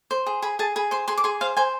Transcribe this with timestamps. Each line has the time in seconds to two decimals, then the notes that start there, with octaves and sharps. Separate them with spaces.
0.11 C5
0.26 G#4
0.42 G#4 B5
0.59 G#4 A5
0.76 G#4 B5
0.91 C5 C6
1.08 G#4 C6
1.17 D6
1.24 G#4 C6
1.41 C5 F5
1.57 C5 G#5